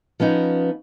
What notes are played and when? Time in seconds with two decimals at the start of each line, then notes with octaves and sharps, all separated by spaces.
0.20 F3 B3 C#4 D#4